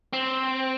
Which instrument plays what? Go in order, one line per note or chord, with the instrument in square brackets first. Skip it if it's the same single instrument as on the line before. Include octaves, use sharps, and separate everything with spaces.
[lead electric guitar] C4